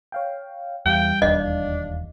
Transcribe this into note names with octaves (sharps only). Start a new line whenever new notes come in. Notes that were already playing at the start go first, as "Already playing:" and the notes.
C#5 F5 G5
E2 G3 F5 G5
E1 D#2 D4 D#5